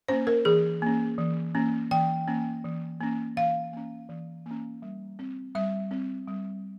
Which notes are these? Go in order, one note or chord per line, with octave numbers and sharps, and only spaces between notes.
A#3 C#4 C5
A#4
E3 G#4
A#3 C#4
E3
A#3 C#4
E3 G5
A#3 C#4
E3
A#3 C#4
E3 F5
A#3 C#4
E3
A#3 C#4
G3
C4
G3 E5
C4
G3